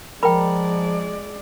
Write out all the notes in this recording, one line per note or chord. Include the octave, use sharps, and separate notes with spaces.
F3 G#3 A#4 D5 G5 B5